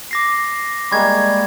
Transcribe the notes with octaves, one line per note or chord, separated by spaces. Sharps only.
D6 A#6 C7
G3 G#3 A#3 C#6 G#6